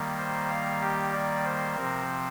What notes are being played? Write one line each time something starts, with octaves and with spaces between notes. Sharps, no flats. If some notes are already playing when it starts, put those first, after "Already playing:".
Already playing: D#3 G3 A#3
C5
F5
G4
D5
C5
C3 F3 C4 A#4